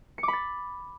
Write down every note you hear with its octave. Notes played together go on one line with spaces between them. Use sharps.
C#7
D6
B5
A6